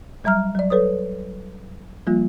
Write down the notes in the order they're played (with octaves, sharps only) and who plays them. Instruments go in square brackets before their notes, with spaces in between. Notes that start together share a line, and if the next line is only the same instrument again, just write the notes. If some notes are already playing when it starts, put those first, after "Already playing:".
[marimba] F#3 G3 E5 A#5 F6
F#3 D5
A4 B4 C#5 D#6
F3 G3 A#3 F4